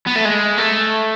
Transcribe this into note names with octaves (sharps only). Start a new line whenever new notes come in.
B3
A3
G#3
A3